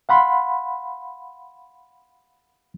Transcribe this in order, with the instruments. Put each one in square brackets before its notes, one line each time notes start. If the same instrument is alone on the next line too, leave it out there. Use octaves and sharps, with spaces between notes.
[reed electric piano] F5 F#5 B5 C6